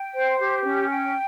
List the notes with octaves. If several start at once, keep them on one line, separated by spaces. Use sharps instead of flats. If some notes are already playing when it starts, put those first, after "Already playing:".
Already playing: G5
C5
G4
C#4
G5